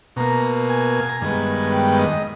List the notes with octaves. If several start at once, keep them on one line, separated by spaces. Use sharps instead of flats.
B2 A#3 A#5
G#5
A#5
G2 D#3 G#3 B3 G#5
G5
D#5